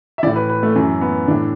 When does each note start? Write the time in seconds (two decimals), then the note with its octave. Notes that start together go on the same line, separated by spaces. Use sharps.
0.18 E5
0.23 E3 D5
0.26 A2
0.36 B4
0.49 B4
0.63 A3
0.76 F#2 E3
1.01 B3
1.28 A2 E3 D4